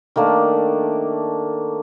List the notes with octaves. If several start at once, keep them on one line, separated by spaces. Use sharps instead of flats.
D#3 A3 A#3 D4